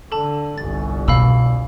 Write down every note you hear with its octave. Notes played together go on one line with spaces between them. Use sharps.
D3 A4 A5
G1 C2 A6
B2 F5 B5 E6